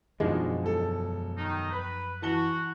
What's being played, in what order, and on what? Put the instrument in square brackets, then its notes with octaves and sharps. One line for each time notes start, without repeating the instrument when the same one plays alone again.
[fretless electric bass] F#2 F3 G#3 [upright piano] B2 D#3 D4
[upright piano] E1 A4
[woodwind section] D#3 D#4
B4
[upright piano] E3 A5 G7 [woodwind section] F#4